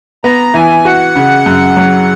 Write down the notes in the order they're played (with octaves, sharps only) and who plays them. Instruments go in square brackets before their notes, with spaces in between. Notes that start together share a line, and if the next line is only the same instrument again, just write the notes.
[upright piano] B3 [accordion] A#5
[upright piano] E3 [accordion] G#5
[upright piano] F#4 [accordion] F#5
[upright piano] C#3
F#2
F#3